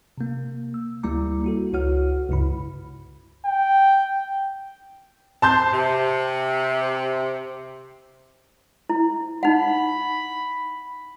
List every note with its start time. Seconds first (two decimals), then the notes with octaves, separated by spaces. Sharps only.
0.18 C3 A#3
0.74 E6
1.03 D2 G3 A#3 E4 A#5 D6
1.44 E4 F#4 A4
1.73 C#2 E4 F#4 C#5 F#5 F6
2.29 C#2 G2 C#3 E4 B5
3.46 G5
5.42 C5 A5 C6 G6
5.72 C3
8.90 E4
9.43 D#4 F#5 B5